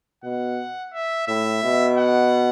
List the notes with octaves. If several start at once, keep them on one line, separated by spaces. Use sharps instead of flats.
B2 F#5
E5
A2 E5
B2
F#5